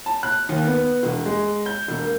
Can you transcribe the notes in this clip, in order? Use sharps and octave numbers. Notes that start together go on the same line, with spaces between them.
A5
F#6
D#2
B3
E1
G#3
G6
E1
A#3